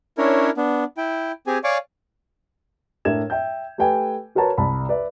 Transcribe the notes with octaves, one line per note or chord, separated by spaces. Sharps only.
C#4 D4 E4 A#4 C#5
B3 D4
E4 G5
C4 G4 G#4 G#5
C#5 D5 F5 G#5 C#6 D6
A2 D4 A#4 E5 G#6 E7
E5 G5 G6
A3 G4 B4 G5 G#5
F#4 A#4 B4 C#5 A5 A#5
C2 A5 B5
B4 D5 E5